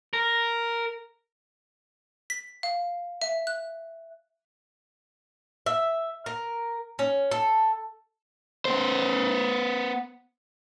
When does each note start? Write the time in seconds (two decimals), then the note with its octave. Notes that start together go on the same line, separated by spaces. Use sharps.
0.13 A#4
2.30 B6
2.63 F5
3.22 E5
3.47 F#6
5.66 E5
6.26 A#4
6.99 C#4
7.31 A4
8.65 B3 C5